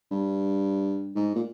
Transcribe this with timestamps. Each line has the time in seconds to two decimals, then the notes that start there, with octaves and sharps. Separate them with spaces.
0.11 G2
1.16 G#2
1.35 A#2